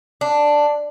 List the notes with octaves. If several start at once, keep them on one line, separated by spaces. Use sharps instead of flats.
D4